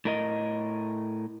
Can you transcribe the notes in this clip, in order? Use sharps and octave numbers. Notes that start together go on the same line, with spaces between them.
A2 A#4 D#5